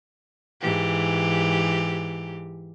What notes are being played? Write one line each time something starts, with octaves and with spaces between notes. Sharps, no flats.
G#2 E3 G4